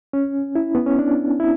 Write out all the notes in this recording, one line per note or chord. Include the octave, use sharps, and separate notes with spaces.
C#4
E4
B3
C#4
D4
E4